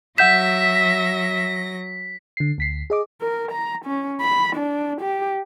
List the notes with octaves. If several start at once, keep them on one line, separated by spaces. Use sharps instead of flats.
F#3 E5 F#5 G6 A#6 B6 E7
D3 C7
D2 B6 C7
G#4 D#5 D6
A#4
A#5
C#4
B5
D4
G4